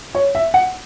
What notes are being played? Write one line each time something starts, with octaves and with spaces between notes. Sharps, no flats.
C#5
E5
F#5